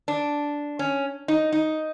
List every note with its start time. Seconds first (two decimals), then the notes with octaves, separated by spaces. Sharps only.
0.08 D4
0.79 C#4
1.28 D#4
1.52 D#4